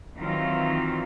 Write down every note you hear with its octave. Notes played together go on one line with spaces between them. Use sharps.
D#3 E3 F#3 C4 E4 F4